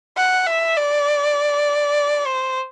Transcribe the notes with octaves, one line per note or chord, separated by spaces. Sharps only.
F#5
E5
D5
C5